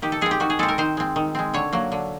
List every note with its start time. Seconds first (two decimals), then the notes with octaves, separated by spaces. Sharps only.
0.02 D#3 G4
0.12 A4
0.21 G#3 C4 G#4
0.31 G4
0.40 D#3 F#4
0.50 G#4
0.59 G#3 C4 A4
0.68 A#4
0.78 D#3 C5
0.97 G#3 C4
1.16 D#3
1.35 G#3 C4
1.54 D3 C#5
1.73 F#3 A#3
1.92 D3